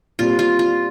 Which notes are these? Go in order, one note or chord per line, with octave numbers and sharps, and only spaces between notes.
A#2 G3 C4 F4
F4
F4